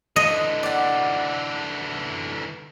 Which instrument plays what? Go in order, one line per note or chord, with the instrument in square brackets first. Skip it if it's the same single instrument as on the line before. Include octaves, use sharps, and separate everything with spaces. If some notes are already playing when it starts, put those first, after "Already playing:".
[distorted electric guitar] D3 E3 [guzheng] D#5
[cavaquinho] D5 F#5